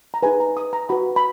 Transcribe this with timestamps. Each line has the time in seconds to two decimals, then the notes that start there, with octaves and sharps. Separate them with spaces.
0.14 A#5
0.23 D#4 G#4 B4 G#5
0.40 A#5
0.57 D#6
0.73 A#5
0.89 F#4 B4 B5
1.16 B5